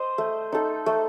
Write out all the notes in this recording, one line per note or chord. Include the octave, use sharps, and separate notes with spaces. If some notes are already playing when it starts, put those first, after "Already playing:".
Already playing: C5 D#5
A3
D#4 A4
A3